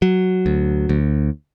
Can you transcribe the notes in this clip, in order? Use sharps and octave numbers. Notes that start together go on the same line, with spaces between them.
F#3
D2
D2